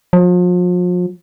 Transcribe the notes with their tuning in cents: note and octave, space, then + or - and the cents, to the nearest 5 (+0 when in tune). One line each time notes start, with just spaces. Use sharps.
F3 +40